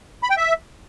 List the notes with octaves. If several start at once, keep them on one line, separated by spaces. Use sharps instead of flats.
B5
G5
E5